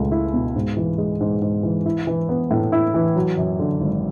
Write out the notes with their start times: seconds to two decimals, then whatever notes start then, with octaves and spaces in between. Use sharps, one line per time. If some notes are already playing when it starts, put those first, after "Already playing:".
Already playing: C#2 A3
0.12 E4
0.34 B2
0.55 G#2
0.77 E3
0.98 G#3
1.20 G#2
1.42 G#2
1.63 E3
1.86 E4
2.07 E3
2.29 B3
2.51 A2
2.72 E4
2.94 E3
3.16 F#3
3.37 F#2
3.59 D3
3.81 G#1